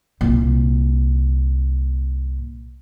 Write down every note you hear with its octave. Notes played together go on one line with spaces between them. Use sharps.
C2 A#2